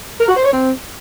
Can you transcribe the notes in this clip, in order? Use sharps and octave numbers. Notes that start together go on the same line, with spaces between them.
A#4
F#4
C5
C#5
C4